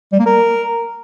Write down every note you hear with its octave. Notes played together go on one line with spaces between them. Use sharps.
G3
A#3
A#4